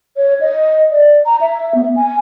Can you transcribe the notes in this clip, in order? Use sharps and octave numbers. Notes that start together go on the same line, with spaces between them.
C#5
D#5
D5
A#5
E5
B3
G#5